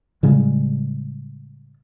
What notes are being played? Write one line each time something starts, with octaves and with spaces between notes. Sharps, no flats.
A2 C#3 G3 G#3